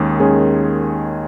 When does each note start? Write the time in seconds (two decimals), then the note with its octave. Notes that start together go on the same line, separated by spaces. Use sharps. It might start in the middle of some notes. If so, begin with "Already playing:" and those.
Already playing: D#2 D#3 G#3 C#4 G#4
0.20 D#2 D#3 G#3 C#4 G#4